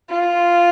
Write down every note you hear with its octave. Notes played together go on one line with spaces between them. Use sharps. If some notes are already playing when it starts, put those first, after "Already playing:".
F4